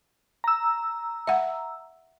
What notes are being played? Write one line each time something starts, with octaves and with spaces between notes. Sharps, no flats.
A#5 E6
E5 F#5